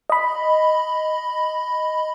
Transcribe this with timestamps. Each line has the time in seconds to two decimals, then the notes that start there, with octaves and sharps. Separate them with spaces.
0.10 D#5 B5